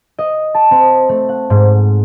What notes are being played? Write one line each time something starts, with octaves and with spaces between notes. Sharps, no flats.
D#5
A5
C4
A3
F#5
G#2